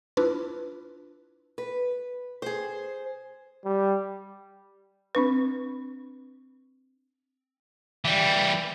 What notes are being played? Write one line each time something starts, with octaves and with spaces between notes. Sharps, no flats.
D4 E4 F4 B4
B4
G#4 C5
G3
C4 D4 B4
E3 G3